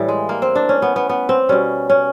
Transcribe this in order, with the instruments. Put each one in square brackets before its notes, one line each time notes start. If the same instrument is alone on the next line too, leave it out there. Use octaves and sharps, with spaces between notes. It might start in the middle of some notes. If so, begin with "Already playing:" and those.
Already playing: [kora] A2 E3 G3
G#3
A#3
C4
D4
C#4
B3
B3
B3
C4
B2 G3 C#4
C#4